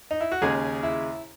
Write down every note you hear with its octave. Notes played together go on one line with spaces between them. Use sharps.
D#4
E4
F#4
D#2 C#3 G#3 G#4
E4